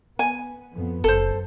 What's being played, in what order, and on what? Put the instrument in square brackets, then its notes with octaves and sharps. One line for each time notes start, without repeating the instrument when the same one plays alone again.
[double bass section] B3 [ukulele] G#5
[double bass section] F2 B3
[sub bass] F#1 [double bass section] F#2 [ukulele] A4 C5